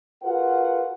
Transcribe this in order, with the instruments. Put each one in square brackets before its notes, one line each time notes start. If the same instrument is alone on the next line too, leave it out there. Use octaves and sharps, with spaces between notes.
[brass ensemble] F4 F#4 G#4 A#4 B4 F#5